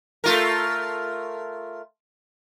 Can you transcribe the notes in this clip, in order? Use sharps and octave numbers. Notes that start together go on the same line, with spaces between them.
A3 F4 A#4